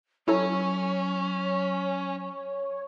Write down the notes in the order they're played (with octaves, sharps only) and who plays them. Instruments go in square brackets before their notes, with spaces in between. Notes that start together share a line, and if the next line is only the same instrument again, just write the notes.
[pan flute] F#3 [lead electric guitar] C#4 [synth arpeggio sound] E4 A4 A#5 [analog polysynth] C#5